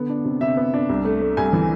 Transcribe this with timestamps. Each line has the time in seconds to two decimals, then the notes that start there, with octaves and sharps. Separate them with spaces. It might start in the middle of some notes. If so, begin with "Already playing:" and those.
Already playing: D3 B3
0.09 D4
0.25 C3
0.41 C3 E5
0.57 B3
0.74 D4
0.89 C2
1.05 A3
1.21 A3
1.37 C2 G#5
1.53 E3